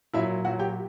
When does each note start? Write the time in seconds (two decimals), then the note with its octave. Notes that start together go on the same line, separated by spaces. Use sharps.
0.13 A#2 F#3 E4 E5
0.45 A#2 F#3 F#4 F#5
0.59 G4 G5